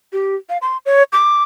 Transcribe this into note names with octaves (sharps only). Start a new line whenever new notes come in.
G4
F5
C6
C#5
D6